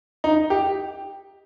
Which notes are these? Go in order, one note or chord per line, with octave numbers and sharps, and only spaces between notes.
D#4
G4